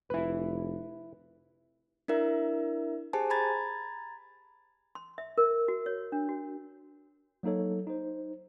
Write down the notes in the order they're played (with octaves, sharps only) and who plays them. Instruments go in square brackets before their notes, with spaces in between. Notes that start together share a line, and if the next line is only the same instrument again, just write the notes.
[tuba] F1 [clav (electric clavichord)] E4 B4
[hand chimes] D4 E4 A#4 E5
G4 G#4 C5 G#5 A5
A#5 B5 G#6 A6
[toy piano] C6
E5
A#4
F#4
C#5
D4
F#4
[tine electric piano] F#3 A#3 D#4 A4 C#5
D#4 C5